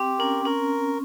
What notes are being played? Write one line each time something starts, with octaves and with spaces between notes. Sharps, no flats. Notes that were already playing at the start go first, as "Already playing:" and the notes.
Already playing: C4 G4
C#4 A#4
C#4 A#4